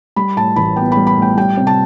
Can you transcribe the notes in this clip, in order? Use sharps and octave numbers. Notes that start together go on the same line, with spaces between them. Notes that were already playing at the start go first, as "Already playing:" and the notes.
G3 B5
A2 A5
A1 B5
B3 G5
B5
G3
B5
A2
G5
G3 G5
C3
A5